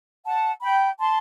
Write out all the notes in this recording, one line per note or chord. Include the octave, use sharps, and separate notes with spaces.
F#5 A5
G5 B5
A5 C6